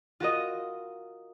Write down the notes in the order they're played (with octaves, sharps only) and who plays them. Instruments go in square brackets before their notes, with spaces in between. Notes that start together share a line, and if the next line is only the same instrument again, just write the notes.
[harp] F4 F#4 A#4 D#5